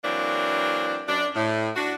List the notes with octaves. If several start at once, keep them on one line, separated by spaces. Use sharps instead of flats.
E3 F#3 A#3 C4 D4
F#2 D4
A2
D4 F#4